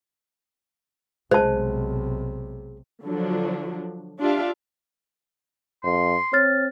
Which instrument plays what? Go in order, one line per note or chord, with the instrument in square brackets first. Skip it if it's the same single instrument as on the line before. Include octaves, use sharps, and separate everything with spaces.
[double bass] B1 C3 [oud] G#3 [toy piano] C5 A5
[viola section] D3 F3 F#3 D4
D4 F4 G4 E5 F5
[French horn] F2 [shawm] C6
[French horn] C4 [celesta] C#5 F6 A6